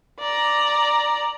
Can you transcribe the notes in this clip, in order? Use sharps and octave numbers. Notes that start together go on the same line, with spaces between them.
D5 A#5